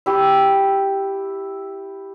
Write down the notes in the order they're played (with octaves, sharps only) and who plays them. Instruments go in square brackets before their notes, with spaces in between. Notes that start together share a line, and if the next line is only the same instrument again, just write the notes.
[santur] E4 G4